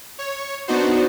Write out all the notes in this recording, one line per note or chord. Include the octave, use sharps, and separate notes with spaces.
C#5
B3 D4 D#4 F#4 C5